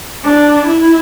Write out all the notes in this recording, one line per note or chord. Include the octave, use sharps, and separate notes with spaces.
D4
E4